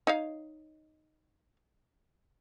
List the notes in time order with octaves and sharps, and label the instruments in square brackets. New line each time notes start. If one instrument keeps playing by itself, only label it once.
[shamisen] D#4 C#5 F5